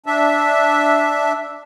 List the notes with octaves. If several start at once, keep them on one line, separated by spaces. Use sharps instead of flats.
D4 E5